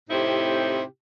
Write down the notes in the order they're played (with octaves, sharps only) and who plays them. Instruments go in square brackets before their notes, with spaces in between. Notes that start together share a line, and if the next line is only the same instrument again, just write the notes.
[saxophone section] A2 C3 C4 D#4 E4 G4